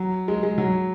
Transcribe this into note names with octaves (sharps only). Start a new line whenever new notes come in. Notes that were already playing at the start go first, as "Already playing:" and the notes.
Already playing: F#3
G#3
G#3
F#3